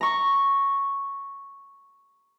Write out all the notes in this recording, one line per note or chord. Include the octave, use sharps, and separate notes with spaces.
A#5 C#6